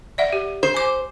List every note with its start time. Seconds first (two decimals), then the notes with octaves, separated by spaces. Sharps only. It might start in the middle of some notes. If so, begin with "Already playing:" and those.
0.18 D5 E5 F#5
0.33 G4
0.63 C5
0.74 G#5 D6